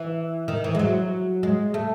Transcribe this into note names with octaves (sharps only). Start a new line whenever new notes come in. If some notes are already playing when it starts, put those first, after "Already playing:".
Already playing: E3
D#3
E3
G#3
F#3
G#3
A3